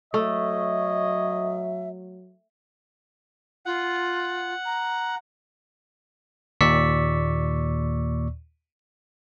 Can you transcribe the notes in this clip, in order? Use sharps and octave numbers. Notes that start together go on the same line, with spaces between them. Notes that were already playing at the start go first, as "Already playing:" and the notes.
F#3 A3 C#5 D#5 E5
F4 F#5
A#5
D#2 A#2 D5 C#6 E6 B6